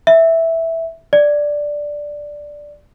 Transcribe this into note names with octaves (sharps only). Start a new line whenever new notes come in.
E5
D5